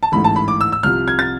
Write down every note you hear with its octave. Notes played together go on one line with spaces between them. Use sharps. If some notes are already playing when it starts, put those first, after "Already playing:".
A5
A1 G#2 E3 A3 B5
A5
B5
D6
E6
E6
C2 C3 F3 F6
G#6
A6